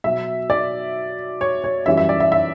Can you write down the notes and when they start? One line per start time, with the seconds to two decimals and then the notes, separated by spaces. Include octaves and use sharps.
0.04 B2 F#3 E5
0.50 D5
1.41 C#5
1.64 C#5
1.86 F#2 E3 G3 E5
1.97 E5
2.09 D5
2.20 E5
2.32 E5